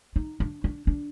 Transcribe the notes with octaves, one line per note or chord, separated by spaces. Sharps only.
D#4
D4
D4
D4